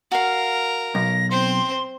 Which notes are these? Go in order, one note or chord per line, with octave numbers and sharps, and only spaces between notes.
F#4 A#4 F5
B1 A#6
C4 C5 C6